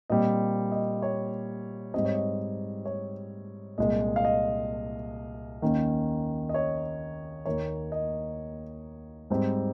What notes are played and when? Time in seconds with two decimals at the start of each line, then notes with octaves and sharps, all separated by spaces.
0.10 A#2 G3 C4 D#5
0.72 D#5
1.02 C#5
1.94 G#2 G3 C4 D#5
2.05 C#5
2.14 D#5
2.86 C#5
3.78 C2 A#2 G#3 D#5
4.16 F5
4.25 D#5
5.62 D#2 D#3 A#3 C#4
6.49 D#5
6.54 C#5
7.46 D#2 D#3 A#3 C#5
7.92 D#5
9.30 G#2 G3 C4